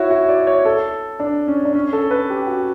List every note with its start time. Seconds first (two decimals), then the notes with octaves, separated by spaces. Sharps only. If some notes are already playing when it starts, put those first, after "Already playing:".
Already playing: E4 F#4 C#5
0.11 F#4
0.29 D5
0.47 C#5
0.65 A4
1.20 D4
1.48 C#4
1.65 D4
1.75 C#4
1.93 A4
2.11 B4
2.30 G4
2.47 F#4